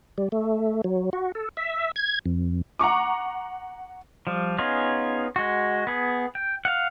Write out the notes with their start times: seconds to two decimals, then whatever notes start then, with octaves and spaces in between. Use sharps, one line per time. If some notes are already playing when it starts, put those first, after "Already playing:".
0.18 G3
0.32 A3
0.84 F#3
1.13 F#4
1.35 A4
1.57 E5
1.96 G#6
2.26 F2
2.79 F#5 A#5 C#6 D6
4.27 F3 G3
4.58 B3 C#4 D#4 F4 G#4
5.36 G#3 F#4
5.87 B3 G#4
6.35 G5
6.65 F5 F#5